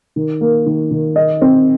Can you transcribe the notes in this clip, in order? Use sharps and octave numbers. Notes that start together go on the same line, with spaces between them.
D#3
A#3
D#3
D#3
D#5
C4